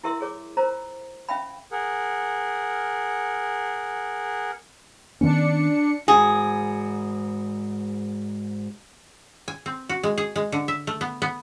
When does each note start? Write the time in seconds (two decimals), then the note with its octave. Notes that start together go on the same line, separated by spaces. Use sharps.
0.04 E4 G4 A#4 E5 C6
0.21 G#4 C#5 D6
0.57 F4 A#4 C5 A#5
1.29 C#4 E5 F5 G5 B5
1.72 G#4 A#4 F#5
5.21 D#3 B3 C#4 D4 C#7
6.08 G#2 F#4 G#4
9.48 G#5
9.66 C4
9.89 F#4
10.03 G#3
10.18 G#4
10.36 G#3
10.52 D3
10.68 E5
10.87 A3
11.01 B3
11.22 B3